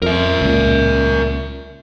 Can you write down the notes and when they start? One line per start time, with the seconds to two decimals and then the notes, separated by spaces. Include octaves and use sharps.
0.02 F2 A#4 E5
0.41 C#2 A#2